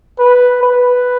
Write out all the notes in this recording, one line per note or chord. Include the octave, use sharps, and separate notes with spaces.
B4
B4